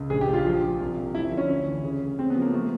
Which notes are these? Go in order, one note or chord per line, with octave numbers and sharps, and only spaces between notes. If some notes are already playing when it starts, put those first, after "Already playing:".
Already playing: C#2
A#1 G#4
G4
A#1
F4
F3
F3
C2
C2
F3 E4
D3
C#4
D2
E3
C#3
C#3
C#3 C4
B3
F3
A#3
F3 A3